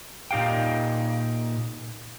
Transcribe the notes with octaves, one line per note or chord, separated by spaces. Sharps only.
A#2 D#4 G4 F5 G5